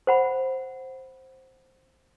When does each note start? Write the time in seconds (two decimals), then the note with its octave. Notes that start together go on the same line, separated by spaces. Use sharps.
0.07 C5 F#5 B5